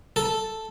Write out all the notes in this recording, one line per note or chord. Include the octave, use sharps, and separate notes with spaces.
A4